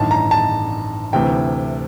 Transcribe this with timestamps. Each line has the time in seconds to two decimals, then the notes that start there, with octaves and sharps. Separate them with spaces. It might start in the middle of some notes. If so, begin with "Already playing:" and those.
Already playing: A1 G2 D#3 A5
0.11 A#5
0.31 A5
1.13 D2 C3 E3 G5